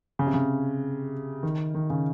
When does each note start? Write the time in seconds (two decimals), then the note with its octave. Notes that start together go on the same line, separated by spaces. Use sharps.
0.19 C#3
0.26 C3
0.34 C#3
1.43 D#3
1.75 D#3
1.90 C#3